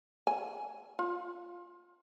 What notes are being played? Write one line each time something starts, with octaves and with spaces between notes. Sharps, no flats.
G#5
F4